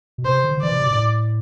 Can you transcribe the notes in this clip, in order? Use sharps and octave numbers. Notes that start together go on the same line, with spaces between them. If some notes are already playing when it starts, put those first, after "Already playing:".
B2
C3 C5
D3
D3
E3 D5
C3
B2
A2